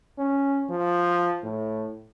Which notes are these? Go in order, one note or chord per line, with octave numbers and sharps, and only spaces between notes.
C#4
F3
A2